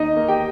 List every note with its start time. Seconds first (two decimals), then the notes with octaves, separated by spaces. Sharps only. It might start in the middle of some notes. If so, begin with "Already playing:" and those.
Already playing: D#2 D#4 D#5
0.16 A#3
0.28 G4 G5